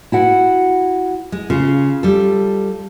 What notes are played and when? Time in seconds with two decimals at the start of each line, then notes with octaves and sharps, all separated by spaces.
0.12 E4 F#4 F#5
1.32 G#3
1.50 C#3 F4
2.03 G3 A4